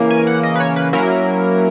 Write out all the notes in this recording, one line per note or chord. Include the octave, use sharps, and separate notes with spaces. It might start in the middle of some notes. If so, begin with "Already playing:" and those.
Already playing: C#3 E3 A#3 C#4
G#5
F#5
D#5
B4
C#5
B4
F#3 A#3 C#4 E4 A#4